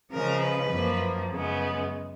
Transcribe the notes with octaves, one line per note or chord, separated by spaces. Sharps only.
C#3 F3 G#3 A#4
B4
F#2 F3 A#3
F#2 C#3 G#3 B3